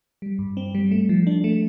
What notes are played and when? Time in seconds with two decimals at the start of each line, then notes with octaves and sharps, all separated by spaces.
0.22 G3
0.39 G2
0.57 C4
0.75 G3
0.91 A3
1.09 F3
1.27 D4
1.44 A3